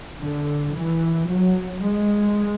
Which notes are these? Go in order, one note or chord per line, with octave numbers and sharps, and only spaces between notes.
D3
E3
F#3
G#3